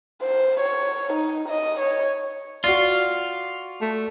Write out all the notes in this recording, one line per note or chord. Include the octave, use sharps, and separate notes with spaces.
C5
C#5
D#4
D#5
C#5
F4 F#4 D5
A3